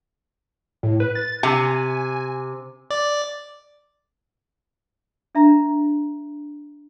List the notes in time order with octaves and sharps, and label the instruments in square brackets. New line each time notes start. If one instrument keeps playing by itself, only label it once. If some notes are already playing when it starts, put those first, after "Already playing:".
[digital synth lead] A2
B4
A6
[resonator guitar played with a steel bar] C3 [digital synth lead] G#5
[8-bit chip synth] D5
[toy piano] D4 E5 A#5